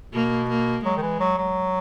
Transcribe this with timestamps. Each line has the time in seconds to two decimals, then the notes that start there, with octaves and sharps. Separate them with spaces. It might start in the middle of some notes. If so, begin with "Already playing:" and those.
0.14 B2 A#3
0.49 A#3
0.85 F#3 G#3
0.97 D#3
1.03 E3
1.20 F#3
1.38 F#3